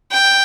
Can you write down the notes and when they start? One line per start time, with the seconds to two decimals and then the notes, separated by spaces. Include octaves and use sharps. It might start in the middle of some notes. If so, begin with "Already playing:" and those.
0.12 G5